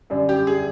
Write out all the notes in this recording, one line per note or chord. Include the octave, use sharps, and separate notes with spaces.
F#2 D3 G3
G4
G#4